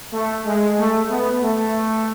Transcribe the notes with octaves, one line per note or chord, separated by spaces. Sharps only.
A3
G#3
A3
B3
A3